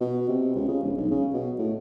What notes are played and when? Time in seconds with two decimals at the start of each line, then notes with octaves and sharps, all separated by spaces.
0.01 B2
0.29 C3
0.55 C#2
0.69 C#3
0.83 E1
0.97 B1
1.11 C#3
1.33 B2
1.58 A2